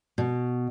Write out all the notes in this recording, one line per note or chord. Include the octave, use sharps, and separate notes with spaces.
B2